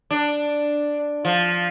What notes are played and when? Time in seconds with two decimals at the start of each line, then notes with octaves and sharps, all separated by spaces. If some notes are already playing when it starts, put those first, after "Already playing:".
0.11 D4
1.25 F3